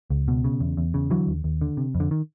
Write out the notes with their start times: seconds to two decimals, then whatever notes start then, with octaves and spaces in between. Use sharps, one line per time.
0.10 C#2
0.28 B2
0.44 C#3
0.60 E2
0.77 E2
0.94 C#3
1.10 D3 E3 F#3
1.27 D#2
1.44 D#2
1.61 D3
1.77 C3
1.95 F2
2.00 D3
2.11 D#3